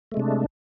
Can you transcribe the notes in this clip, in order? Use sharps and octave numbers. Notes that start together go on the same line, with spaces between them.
C3 G#3 A3 D4